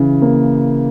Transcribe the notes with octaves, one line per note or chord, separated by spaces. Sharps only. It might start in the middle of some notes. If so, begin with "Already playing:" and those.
Already playing: C#3 E3
A#3